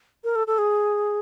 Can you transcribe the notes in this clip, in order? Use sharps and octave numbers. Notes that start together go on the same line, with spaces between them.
A#4
A4
A4
G#4